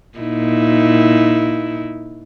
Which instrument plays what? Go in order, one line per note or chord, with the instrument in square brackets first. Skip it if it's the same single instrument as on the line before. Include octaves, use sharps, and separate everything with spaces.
[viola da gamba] A#2 D#4 E4